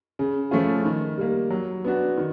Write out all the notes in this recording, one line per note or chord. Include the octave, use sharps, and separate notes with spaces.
C#3
F3 A3 C#4 F4
D#3
G3 A#3
F#3
B3 D4 F#4
D#3